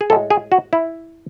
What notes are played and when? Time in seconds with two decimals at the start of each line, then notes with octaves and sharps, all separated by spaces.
0.01 G#4
0.10 A2 G#3 A4
0.30 G#4
0.52 F#4
0.73 E4